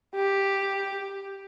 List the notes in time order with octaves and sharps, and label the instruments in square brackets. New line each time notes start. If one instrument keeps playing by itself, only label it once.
[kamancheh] G4